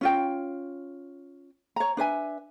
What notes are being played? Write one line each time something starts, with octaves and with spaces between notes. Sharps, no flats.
C#4 F4 G5
C#5 A#5
D4 B4 E5 G#5